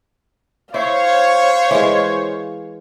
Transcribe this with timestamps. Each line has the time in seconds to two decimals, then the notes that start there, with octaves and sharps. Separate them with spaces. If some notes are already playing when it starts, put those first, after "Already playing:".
0.74 E4 C5 C#5 F5
1.71 E3 G#3